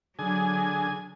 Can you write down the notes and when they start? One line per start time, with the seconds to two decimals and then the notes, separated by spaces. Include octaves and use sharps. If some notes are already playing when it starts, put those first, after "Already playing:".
0.19 D3 F#3 G#4 G#5